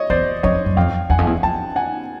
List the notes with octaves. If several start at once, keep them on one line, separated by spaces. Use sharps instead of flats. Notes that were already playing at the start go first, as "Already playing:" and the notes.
Already playing: C#5 D#5
E2 C5 D5
F2 C#5 D#5
F#2
F2 F5 G5
E2 F#5 G#5
F2
E2
F2 G5 A5
F#5 G#5